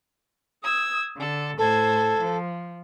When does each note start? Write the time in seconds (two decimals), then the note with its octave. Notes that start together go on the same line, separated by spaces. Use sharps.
0.62 D#6 E6 G#6
1.15 D3 A4
1.58 A2 A4 C5 G#6
2.19 F3